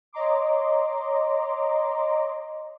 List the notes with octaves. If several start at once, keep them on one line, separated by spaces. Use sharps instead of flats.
C#5 D#5 A#5 C6 D6